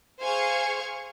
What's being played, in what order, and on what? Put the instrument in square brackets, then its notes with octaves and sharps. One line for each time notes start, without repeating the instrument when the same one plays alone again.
[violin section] G#4 C5 F5 G#5 C#6